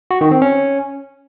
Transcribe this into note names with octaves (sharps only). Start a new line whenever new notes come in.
F#4
D#3
C4
C#4